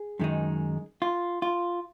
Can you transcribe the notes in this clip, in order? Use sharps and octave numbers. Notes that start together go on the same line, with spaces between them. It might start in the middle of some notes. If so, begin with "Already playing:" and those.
Already playing: G#4
F#2 D#3 G#3 D#4
F4
F4